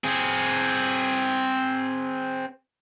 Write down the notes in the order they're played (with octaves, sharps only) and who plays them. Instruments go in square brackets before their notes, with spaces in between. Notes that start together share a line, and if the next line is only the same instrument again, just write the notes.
[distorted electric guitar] C4 G#4